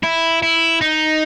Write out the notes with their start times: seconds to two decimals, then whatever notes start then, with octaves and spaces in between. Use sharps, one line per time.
0.03 E4
0.43 E4
0.81 D#4